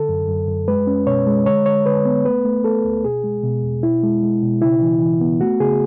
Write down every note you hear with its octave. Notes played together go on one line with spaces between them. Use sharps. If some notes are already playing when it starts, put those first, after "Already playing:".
Already playing: D3 A4
F#2
F#2
F#2
G#3 B4
C#4
B2 C#5
G#3
D3 C#5
D3 C#5
D3 B4
B3
A3 B4
A3
A3 A4
D2
B2 G#4
G#3
B2
E2
B2 E4
G#3
G#3
B2
C#3 E4
E3
E3
B3
A3 F#4
C#3 G#4